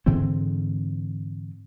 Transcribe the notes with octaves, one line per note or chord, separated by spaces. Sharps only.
G#2 D3 E3 C4